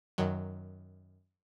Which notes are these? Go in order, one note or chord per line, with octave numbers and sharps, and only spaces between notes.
F#2 D#3 F#3